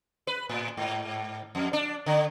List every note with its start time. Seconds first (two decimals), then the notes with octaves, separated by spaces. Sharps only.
0.27 B4
0.49 A2
0.77 G#2
1.55 F2
1.73 D4
2.06 D3